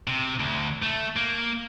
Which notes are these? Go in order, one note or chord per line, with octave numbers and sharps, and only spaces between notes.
C3
D2
A3
A#3